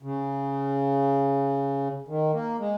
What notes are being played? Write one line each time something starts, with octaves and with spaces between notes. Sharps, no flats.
C#3
D#3
A#3
G#3